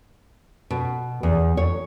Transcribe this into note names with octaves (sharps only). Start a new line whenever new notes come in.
B2
E2
C#5